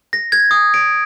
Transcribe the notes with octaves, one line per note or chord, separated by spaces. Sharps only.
A#6
G#6
D#6
D7